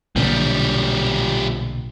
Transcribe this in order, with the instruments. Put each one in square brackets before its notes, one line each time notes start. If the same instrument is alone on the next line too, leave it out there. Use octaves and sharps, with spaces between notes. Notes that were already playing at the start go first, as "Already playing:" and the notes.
[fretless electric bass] B1 A#2 D3 [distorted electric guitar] F3 G3